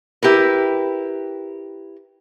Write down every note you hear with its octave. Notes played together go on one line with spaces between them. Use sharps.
E4 G4 A#4 B4